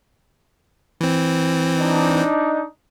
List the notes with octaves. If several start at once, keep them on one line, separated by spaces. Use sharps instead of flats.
E3 C4
D4 D#4